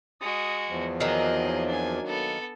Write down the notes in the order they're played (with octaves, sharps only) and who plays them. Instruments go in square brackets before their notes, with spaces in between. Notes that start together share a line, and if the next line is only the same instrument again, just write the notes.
[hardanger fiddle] G#3 F#4 [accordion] D#6
[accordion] E2 F3
[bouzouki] D#3 F#3 A#3 [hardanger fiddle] G#4 D#5
[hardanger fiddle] D4 G#5
B3 A4